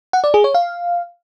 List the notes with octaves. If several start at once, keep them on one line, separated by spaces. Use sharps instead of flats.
F#5
D5
G#4
C#5
F5